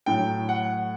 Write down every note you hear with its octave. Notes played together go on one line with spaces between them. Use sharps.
A2 F#3 G5
F#5